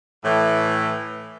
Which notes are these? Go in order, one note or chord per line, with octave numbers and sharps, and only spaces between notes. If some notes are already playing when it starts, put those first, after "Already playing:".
A2 E3